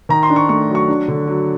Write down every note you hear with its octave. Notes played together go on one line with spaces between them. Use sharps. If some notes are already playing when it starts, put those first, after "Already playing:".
D#3 A#5
C6
D4
C#6
A3 C#6
F#3
C#6
D4
D3
F#3